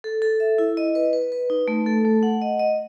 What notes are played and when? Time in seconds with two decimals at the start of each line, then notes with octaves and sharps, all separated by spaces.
0.04 A4
0.22 A4
0.40 E5
0.58 E4
0.77 D#5
0.95 B4
1.13 B4
1.32 B4
1.50 D#4
1.68 A3
1.86 A4
2.05 A3
2.23 F#5
2.41 D#5
2.59 D#5